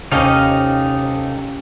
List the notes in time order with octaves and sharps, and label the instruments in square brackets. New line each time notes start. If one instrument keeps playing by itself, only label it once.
[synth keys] D#2 C3 [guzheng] C#4 G4 D#5 [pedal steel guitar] D#4 A4 F5